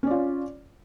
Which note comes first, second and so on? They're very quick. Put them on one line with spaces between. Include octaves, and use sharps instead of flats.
C#4 D5 F4